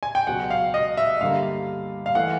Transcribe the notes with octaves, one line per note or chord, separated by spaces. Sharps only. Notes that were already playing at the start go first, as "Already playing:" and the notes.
G#5
G5
C#2 B2 F#3 F#5
F5
D#5
E5
G2 D3 G3 A#3 F5
F5
E3 A3 F#5